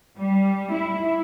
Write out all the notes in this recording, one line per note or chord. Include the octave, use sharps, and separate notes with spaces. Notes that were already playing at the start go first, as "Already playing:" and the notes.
G3
E4